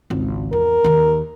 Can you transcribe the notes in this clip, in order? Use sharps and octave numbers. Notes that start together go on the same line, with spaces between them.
G#1 C#2
E2 A#4
D#2 D#3